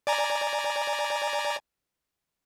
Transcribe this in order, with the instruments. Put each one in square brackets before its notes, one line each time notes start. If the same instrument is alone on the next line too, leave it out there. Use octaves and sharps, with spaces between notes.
[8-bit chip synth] D5 G#5 A#5